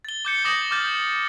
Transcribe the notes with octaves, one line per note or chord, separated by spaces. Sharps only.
A6 G7
D6 G6 C#7
D6 D#6 G6 A#6 F#7
D6 F6 G6 A6 G7